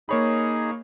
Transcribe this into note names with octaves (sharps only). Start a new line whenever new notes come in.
A#3 D#4 G#4 C#5 B5